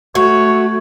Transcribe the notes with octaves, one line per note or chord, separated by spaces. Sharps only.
A3 F#4 C#5